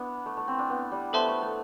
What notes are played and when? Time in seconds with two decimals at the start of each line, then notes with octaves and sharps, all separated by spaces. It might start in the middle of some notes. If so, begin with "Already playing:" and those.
Already playing: B3 D4 E4
0.26 A3
0.37 A3
0.48 C4
0.59 D4
0.70 B3
0.91 G3
1.13 B3 A4 C5 E5 A5 C6
1.28 A3
1.42 A3